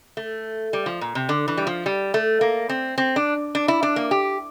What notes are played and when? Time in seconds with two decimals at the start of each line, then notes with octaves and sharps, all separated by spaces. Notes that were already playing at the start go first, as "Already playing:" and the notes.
0.17 A3
0.73 G3
0.86 F3
1.01 A#2
1.15 C3
1.29 D3
1.48 E3
1.57 G3
1.67 F3
1.86 G3
2.14 A3
2.41 A#3
2.69 C4
2.98 C4
3.16 D4
3.55 D4
3.68 E4
3.83 D4
3.96 A#3
4.11 G4